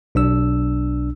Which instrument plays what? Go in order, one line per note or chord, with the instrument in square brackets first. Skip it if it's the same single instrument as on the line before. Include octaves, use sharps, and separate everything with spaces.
[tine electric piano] B1 D4 E6